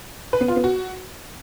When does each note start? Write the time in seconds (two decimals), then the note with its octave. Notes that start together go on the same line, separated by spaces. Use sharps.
0.33 B4
0.41 B3
0.48 F4
0.56 B3
0.64 F#4